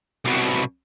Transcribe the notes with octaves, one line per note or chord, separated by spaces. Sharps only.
C2 B2